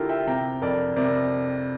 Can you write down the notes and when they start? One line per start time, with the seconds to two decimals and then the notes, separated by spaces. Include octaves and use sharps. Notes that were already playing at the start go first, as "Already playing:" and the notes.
Already playing: D3 E4 F4 G4 A4 A#4
0.09 E5 G5
0.27 C3 G5 A#5
0.62 F2 A#4 D5
0.96 C3 A#4 D5